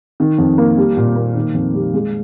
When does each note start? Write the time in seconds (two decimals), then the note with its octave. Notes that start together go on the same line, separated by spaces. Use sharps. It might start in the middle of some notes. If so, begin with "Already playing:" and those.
0.20 D#3
0.38 F2
0.58 A#3
0.77 G3
0.97 A#2
1.16 A#3
1.35 D#3
1.55 F2
1.74 G3
1.94 G#3